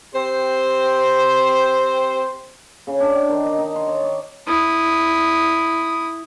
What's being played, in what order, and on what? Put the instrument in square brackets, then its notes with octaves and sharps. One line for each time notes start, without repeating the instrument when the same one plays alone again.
[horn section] C4 G4 C5
[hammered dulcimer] C#3
D4
G5
D#3
D#5
D#4
C6
C#5
D6
[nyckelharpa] E4 D#6